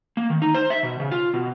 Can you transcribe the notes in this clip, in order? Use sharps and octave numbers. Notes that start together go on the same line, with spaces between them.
A#3
D#3
D#4
C5
E5
B2
C#3
F4
B2